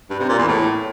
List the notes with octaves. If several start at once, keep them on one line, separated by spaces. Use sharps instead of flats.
G2
C3
A#2
E2
A2